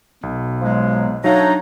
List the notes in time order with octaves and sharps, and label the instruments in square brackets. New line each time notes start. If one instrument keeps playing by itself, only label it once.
[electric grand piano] B1 [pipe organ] B2
[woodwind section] F3 F#3 G#3
[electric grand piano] F#3 F5 [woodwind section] A3 D4 D#4 [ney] C#5 [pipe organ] A#5